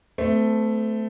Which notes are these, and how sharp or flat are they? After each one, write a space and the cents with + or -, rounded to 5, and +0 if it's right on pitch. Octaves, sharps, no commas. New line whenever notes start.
A3 +0 C4 -35